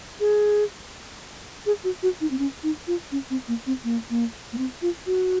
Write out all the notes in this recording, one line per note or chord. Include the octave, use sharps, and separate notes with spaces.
G#4
G#4
F#4
F#4
D#4
C4
C#4
D#4
F4
C#4
C4
A#3
C4
A#3
A#3
A#3
C4
F4
F#4